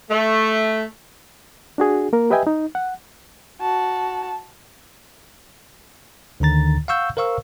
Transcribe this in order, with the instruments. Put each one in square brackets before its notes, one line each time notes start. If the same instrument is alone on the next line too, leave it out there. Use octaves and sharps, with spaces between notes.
[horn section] A3
[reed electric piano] D4 F#4 G#4
A#3 A#4
G4 B4 D#5 E5 G5 G#5
D#4
F#5
[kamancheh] F#4 A5
[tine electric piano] D2 D3 D#3 A#5 A6
F5 F#5 C#6 E6 G6
A#4 C5 F5 C#6 E6